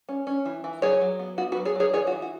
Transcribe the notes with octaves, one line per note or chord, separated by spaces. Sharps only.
C#4
C#4
E3
E3
F#3 G#4 C#5
F#3
B3
B3 F#4
F#4 B4
F#3
G#4 C#5
F#3 G#4 C#5
E3 G#4 C#5
F#4
E3
F#4